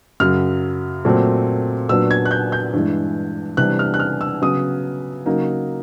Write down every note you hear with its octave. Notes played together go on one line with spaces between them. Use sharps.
F#2 C#3 F#3 F6
A#2 F#3 A3 C4
A#2 F#3 B3 D4 E6
G#6
F#6
G6
G6
G2 E3 G#3
C3 E3 G3 B3 D4 F#6
F6
F#6
F6
E6
C#3 F#3 B3 D#6
C#3 F#3 A#3 D#4